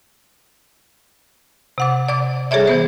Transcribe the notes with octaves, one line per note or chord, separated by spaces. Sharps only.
C3 F#5 D6
D5 D6
G3 G#4 A4 C#5 D5 E5
E3 B3 C5